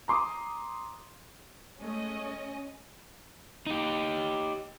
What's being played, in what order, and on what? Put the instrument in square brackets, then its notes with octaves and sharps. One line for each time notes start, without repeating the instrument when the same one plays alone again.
[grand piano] A#5 C6 D6 D#6
[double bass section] G#3 A3 [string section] C#4 D#5
[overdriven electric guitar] D#4 G4